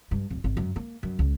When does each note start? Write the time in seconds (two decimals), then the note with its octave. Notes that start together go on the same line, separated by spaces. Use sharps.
0.11 G2
0.30 D1
0.44 G#1
0.57 F#2
0.76 A#3
1.03 F#2
1.19 C#2